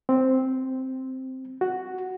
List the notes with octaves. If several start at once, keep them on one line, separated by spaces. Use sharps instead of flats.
C4
F#4